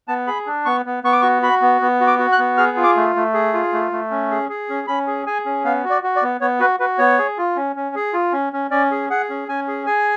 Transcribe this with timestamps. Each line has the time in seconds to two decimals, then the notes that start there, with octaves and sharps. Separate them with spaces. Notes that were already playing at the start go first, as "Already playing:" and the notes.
0.08 B3 A5
0.27 G#4 B5
0.46 D4
0.65 B3 C#6
0.86 B3
1.04 B3 C#6
1.13 D6
1.21 F#4 C#6
1.42 F#4 B5
1.61 B3
1.81 B3
2.01 F#4
2.07 D6
2.19 F#4
2.32 F#6
2.39 B3
2.57 G#4 F6
2.77 F4
2.83 D6
2.96 A3
3.16 A3
3.34 G#4
3.54 F4
3.73 A3
3.92 A3
4.11 C#4
4.31 G#4
4.49 G#4
4.69 C#4
4.87 C#4 B5
5.07 G#4
5.27 G#4 G#5
5.46 C#4
5.65 B3 F5
5.84 F#4
5.90 D5
6.03 F#4
6.16 D5
6.22 B3
6.41 B3 C#5
6.60 F#4 B4
6.80 F#4 B4
6.98 B3 C#5
7.19 G#4
7.38 F4
7.56 C#4
7.76 C#4
7.95 G#4
8.13 F4
8.33 C#4
8.53 C#4
8.71 C#4 D5
8.91 G#4
9.10 G#4 F#5
9.29 C#4
9.48 C#4 G#5
9.68 G#4
9.86 G#4 G#5